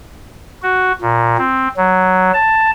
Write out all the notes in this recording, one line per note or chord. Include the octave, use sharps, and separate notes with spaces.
F#4
A#2
C4
F#3
A5